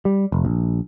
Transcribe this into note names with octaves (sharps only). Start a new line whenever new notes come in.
G3
F1
A#1